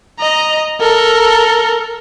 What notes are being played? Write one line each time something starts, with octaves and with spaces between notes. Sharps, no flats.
D#5 A#5
A4 A#4